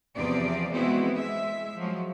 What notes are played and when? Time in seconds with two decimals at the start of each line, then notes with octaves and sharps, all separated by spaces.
0.15 E2 C3 E3 F3 G#4 D5
0.72 G#3 B3 C4 E4 F#4
1.14 G#3 E5
1.76 F3 F#3 G#3